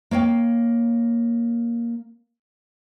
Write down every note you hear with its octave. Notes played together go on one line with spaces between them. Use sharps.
A#3 C#5 F5 G5